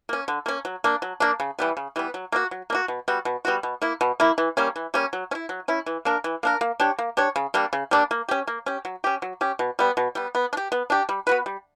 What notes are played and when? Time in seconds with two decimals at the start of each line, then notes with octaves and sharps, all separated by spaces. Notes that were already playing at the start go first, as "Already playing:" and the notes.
0.09 A#3 C#4
0.28 D3
0.46 A#3 C#4
0.65 F#3
0.84 A#3 D4
1.02 F#3
1.20 A#3 D4
1.40 C#3
1.59 E3 G3 B3
1.77 C#3
1.96 E3 G3 B3
2.14 F#3
2.32 A#3 D4 F#4
2.51 F#3
2.70 A#3 D4 F#4
2.88 B2
3.08 G3 B3 F#4
3.25 B2
3.45 G3 B3 F#4
3.63 B2
3.82 A#3 E4
4.01 B2
4.20 A#3 E4
4.38 E3
4.57 G3 A#3 C#4
4.76 E3
4.94 G3 A#3 C#4
5.13 F#3
5.31 C#4
5.35 E4
5.49 F#3
5.68 C#4 E4
5.86 E3
6.05 A#3 D4 A#4
6.24 E3
6.43 A#3 D4 A#4
6.61 A#3
6.80 D4 G4 C#5
6.99 A#3
7.17 D4 G4 C#5
7.36 C#3
7.54 G3 A#3 D4
7.73 C#3
7.91 G3 A#3 D4
8.11 A#3
8.29 C#4 G4
8.47 A#3
8.66 C#4 G4
8.85 F#3
9.04 C#4 G4
9.22 F#3
9.41 C#4 G4
9.59 B2
9.79 G3 B3
9.97 B2
10.15 G3 B3
10.35 B3
10.53 D4
10.57 G4
10.72 B3
10.90 D4 G4
11.09 G3
11.27 B3 F#4 B4
11.46 G3